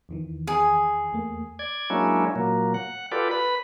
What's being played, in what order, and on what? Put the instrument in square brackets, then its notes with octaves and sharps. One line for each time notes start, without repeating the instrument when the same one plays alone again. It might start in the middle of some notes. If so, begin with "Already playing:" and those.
[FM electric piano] E2 D#3 E3
[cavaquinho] G#4
[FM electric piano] E2 A3 A#3
[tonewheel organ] D5 G#6
F#3 G#3 A#3 C#4 D4 E4
A#2 F#3 A#3
F#5
F4 G4 A4 B4 D5
B4 B5